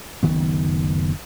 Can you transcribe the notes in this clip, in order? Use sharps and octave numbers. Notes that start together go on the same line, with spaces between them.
F#1 D2 D#3 B3